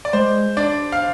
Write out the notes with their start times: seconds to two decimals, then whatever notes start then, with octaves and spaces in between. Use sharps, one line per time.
0.05 D5
0.13 G#3 C5
0.57 D4 D5
0.92 F5